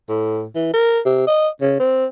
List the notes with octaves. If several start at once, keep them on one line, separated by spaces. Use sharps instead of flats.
A2
E3
A#4
C3
D#5
C#3
C4